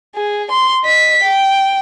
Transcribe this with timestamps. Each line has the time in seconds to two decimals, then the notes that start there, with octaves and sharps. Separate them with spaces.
0.15 G#4
0.51 C6
0.84 D#5 B6
1.23 G5